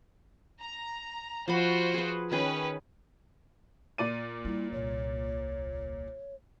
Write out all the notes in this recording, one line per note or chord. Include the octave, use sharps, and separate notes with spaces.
A#5
F3 F4 F#4 C5 F#5 B5
G#4 B4
D#3 C#4 G#4 B4 G5
A#2 D5 D#7
G3 E4
D#1 C2 C#5